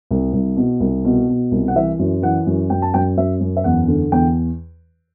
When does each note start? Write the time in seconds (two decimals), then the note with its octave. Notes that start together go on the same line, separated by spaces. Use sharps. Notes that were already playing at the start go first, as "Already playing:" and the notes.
0.11 C2
0.33 C2
0.57 B2
0.80 C2
1.05 B2
1.29 B2
1.52 C2
1.68 F#5
1.75 E3 E5
1.99 F#2
2.22 E3 F#5
2.47 F#2
2.70 F#2 G5
2.82 A5
2.94 F#2 G5
3.17 F#2 E5
3.40 F#2
3.57 E5
3.64 E2 F#5
3.88 D3
4.12 E2 G5